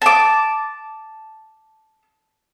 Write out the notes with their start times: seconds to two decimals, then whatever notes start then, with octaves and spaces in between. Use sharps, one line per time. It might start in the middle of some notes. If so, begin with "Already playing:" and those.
0.02 A5 D6